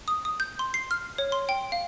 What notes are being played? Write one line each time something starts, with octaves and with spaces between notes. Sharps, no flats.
D#6
D#6
G6
C6
C7
F6
C#5
C6
G5
F5